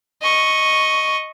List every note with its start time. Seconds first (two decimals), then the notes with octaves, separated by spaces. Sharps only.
0.22 D#5 C#6